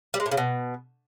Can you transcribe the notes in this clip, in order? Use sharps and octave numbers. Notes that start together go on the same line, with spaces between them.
G3
G#3
A2
C#3
B2